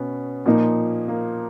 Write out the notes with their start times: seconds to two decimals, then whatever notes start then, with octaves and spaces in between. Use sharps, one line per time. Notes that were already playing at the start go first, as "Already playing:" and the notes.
Already playing: B2 B3 C#4
0.46 A#2 F3 A#3 D#4
1.08 A#3